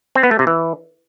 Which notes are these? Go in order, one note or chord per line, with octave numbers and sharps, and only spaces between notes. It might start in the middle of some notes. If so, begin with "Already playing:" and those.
C4
B3
A3
C3
E3